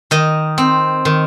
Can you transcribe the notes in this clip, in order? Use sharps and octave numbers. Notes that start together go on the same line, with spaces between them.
D#3 D#5
C4
D#3